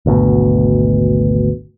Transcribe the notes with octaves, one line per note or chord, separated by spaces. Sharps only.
G#1 D2 B2